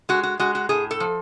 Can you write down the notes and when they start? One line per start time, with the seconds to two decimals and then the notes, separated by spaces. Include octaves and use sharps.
0.09 G#3 F#4
0.23 F#4
0.39 G#3 F#4
0.55 F#4
0.69 A2 G#4
0.91 A4
1.00 F3